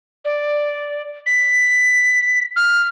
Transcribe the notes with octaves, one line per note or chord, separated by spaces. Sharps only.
D5
B6
F6